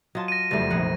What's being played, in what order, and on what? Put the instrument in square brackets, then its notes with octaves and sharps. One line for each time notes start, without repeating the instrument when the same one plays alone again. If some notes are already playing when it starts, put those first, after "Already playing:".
[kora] F#3 F4 [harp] D#5 A5
[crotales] A#6 D#7
[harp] F#1 F2 [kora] G3 A3
[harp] F1 A#1 G#4 [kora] F#5